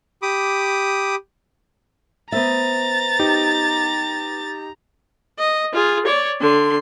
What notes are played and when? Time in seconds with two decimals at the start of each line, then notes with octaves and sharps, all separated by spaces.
0.22 G4 B5 D6 D#6
2.32 B3 C5 E5 A#5 A6
3.19 D#4 G4
5.39 D#5
5.73 F4 G#4
6.06 C#5 D5
6.41 D3 C6